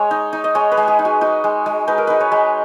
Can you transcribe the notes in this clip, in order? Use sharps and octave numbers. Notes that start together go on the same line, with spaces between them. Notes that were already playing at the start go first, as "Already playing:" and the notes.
Already playing: G#3 C#5
D#4
D#4
D#5
G#3 C#5
B4
G#3
G#4
D#4
F#4
D#4 F#4
G#3
G#3
D#4 B4
A#4
D#4 B4
C#5
G#3